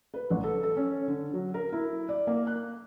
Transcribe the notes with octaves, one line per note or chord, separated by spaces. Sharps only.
B4
A1
A4
A4
C#4
D3
F#3
A#4
E4
D5
A#3
F#6